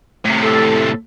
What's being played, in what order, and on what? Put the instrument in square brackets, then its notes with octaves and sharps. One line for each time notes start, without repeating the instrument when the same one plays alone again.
[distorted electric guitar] A2 C3
[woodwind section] A4